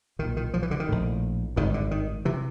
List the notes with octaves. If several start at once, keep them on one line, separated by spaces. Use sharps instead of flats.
B1 A#2 D#3
D#3
F3
E3
D3
D#3
A#1 A2
G#1 G2 D3 D#3
D3
D#3
C3 E3